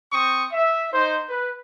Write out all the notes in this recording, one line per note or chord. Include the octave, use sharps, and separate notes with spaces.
C4 C#6 D#6
E5
D#4 C5
B4